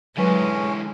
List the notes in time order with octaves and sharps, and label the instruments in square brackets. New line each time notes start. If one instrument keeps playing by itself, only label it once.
[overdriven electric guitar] D3 E3 [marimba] F#3 B4 [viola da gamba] G#3 [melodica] C#4